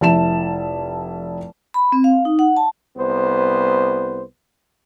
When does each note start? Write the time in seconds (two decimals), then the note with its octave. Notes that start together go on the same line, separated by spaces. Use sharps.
0.01 F1 E4 A5 E7
1.74 B5
1.92 C4
2.04 F5
2.25 D#4
2.39 F#5
2.57 A5
2.97 C2 B3 C5